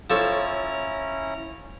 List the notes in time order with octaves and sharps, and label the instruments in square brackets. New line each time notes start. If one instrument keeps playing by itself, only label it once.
[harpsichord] F3 A4 C#5 [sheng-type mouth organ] C#4 E4 A#5